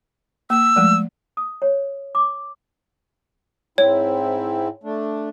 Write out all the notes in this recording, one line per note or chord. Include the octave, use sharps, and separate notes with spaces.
A#3 E6
F3 G#3 A3
D#6
C#5
D6
G#2 C4 E4 C#5
A3 D4